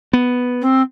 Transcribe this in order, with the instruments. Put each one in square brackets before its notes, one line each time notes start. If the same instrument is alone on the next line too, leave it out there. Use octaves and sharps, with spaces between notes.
[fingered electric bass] B3
[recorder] C4